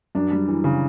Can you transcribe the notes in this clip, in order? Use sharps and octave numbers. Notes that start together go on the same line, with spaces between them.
F#2 D4
G3
E3
C#3